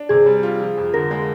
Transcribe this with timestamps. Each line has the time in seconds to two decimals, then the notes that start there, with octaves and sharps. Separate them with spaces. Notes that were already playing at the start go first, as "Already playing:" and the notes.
Already playing: D4
0.09 C3 G#4
0.26 G3
0.43 F4
0.60 F3
0.77 F2
0.94 D3 A#4
1.11 G#3